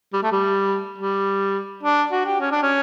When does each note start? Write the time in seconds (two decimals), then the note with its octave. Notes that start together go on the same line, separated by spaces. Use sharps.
0.13 G3
0.23 A3
0.32 G3
0.98 G3
1.83 D4
2.12 F#4
2.26 G4
2.40 C#4
2.51 D4
2.62 C#4